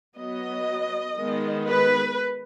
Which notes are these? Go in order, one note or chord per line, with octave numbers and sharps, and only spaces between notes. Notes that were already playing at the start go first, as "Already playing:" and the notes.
F#3 B3 D#5
D#3 G#3 B3
B4